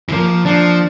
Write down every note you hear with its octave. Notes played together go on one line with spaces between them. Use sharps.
E3
F3 A#3
F3 D4